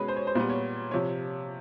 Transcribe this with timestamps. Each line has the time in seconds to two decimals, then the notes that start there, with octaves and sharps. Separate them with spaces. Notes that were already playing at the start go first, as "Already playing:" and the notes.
Already playing: B2 G#3 C#4 G#4 B4
0.08 C5
0.16 C#5
0.27 C5
0.35 A#2 G3 B3
0.50 C#5
0.91 C3 F3 C#5